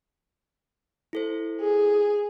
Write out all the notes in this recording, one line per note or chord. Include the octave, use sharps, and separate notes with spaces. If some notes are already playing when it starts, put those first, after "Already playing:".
E4 A4 C5
G#4